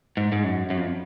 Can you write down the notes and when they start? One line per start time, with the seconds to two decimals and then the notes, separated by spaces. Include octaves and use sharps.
0.17 G#2
0.32 G#2
0.44 F#2
0.70 F#2
0.77 F2